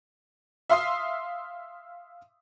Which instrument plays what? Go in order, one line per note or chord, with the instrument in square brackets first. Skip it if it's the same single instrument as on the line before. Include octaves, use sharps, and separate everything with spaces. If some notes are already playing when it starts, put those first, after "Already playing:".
[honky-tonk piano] E5 F5 C6 D#6 C7